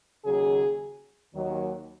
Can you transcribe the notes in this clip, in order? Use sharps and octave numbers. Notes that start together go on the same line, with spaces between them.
D#2 C#3 F#3 G#4
D#2 D#3 F#3